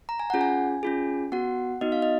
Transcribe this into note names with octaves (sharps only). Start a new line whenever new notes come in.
A#5
G#5
C#4 F4 G#4 F#5
G#5
C#4 F4 G#4
B3 F#4 F#5
B3 D#4 F#4 D#5
F5
D#5